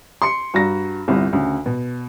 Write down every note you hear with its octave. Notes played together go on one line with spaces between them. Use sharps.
C6 C#7
G2 F#4 A#5 A#6
G1 C2 C3
D2 C#3
B2